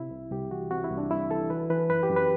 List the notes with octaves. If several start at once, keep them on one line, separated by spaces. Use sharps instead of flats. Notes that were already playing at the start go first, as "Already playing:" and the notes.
Already playing: C3 E4
C2
C2 G4
E3 F#4
C3 F#4
E4
C2
D4
C2 E4
E3 A4
E3 B4
E3 B4
F#2 B4
G4
F#2
B4